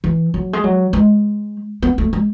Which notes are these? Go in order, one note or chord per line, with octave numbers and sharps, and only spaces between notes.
E3
F#3
G#3
F#3
G#3
B3
A3
G#3